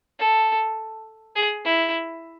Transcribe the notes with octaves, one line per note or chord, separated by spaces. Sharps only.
A4
G#4
E4